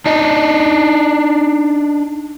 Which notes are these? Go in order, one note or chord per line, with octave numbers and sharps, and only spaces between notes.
D4 D#4 D#5